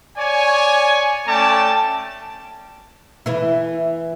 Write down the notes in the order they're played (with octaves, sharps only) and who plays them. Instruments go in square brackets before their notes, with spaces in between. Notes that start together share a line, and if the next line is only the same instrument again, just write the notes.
[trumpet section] C#5 D5 G#5
A3 C#4 D5 G5 A5
[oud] E3 E4